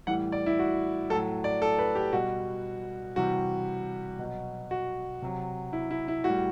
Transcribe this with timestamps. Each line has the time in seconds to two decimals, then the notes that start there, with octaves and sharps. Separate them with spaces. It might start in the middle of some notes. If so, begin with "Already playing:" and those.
0.07 A2 E3 G3 F#5
0.32 D5
0.46 E4
0.59 F#4
1.10 A2 F#3 A4
1.44 D5
1.62 A4
1.79 B4
1.95 G4
2.13 B2 G3 F#4
3.16 C3 E3 G3 F#4
4.19 B2 F#3
4.71 F#4
5.22 C3 F#3
5.73 E4
5.91 E4
6.08 E4
6.24 A2 F#4
6.30 G3